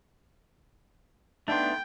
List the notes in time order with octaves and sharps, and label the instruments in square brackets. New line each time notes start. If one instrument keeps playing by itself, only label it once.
[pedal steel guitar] A3 B3 [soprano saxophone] D4 [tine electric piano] D#4 C6 [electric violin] G5